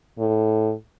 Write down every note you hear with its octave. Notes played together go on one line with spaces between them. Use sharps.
A2